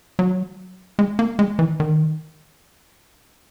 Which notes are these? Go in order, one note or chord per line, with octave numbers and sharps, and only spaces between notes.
F#3
G#3
A#3
G#3
E3
D#3